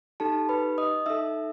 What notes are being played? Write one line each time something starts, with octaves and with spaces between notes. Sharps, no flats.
D#4 G4 A4 A5
B4 B5
D#5 D#6
D#4 A4 E5 E6